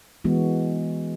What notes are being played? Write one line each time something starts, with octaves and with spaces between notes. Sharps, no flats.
E3 G#3 B3 F#4